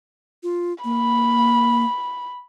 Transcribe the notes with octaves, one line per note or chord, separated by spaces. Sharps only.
F4
A#3 B5